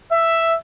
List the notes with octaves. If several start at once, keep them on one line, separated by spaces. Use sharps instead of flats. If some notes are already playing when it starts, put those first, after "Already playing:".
E5